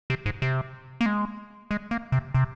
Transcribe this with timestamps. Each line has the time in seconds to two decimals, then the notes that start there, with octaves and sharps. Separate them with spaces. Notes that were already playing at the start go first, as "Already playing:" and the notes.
0.10 C3
0.26 G#2
0.42 C3
1.01 A#3
1.06 G#3
1.71 G#3
1.91 A#3
2.12 C3
2.34 C3